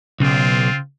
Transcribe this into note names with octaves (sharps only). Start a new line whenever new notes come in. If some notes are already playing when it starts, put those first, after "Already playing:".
B1 C#3 C4 F4